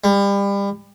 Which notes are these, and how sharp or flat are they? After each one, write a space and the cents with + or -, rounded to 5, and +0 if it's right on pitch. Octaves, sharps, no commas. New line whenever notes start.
G3 +30